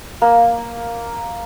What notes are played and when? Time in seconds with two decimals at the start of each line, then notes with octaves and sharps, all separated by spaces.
0.22 A#3